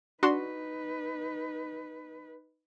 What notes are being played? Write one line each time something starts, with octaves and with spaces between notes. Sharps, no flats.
D4 D#4 F#4 B4 C6